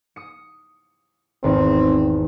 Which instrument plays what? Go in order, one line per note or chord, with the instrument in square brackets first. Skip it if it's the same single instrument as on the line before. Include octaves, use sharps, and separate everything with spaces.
[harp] D#6 C#7
[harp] G#1 E2 D#4 [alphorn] C4